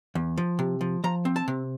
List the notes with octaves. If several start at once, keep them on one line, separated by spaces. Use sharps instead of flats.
E2
F3
C3
F3
F3 A#5
C4
A5
C3